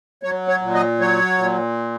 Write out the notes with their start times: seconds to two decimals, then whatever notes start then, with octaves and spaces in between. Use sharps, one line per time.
0.23 F#3 C#5
0.48 C#5
0.62 A#2
0.74 D#5
1.00 F#3 C#5
1.38 A#2